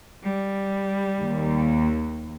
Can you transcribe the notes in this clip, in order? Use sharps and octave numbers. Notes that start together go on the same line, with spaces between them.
G3
D#2